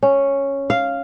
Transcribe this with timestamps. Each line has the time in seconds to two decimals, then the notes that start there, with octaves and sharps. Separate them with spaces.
0.03 C#4
0.70 F5